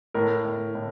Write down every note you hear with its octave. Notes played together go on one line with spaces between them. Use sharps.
A2 A#4
A2
A2